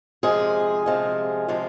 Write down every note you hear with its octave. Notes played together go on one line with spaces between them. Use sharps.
C3 F3 G#3 G#4
C3 F3 G#3
C3 F3 G#3